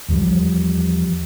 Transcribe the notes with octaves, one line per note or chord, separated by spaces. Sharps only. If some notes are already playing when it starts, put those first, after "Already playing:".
E2 F3 G3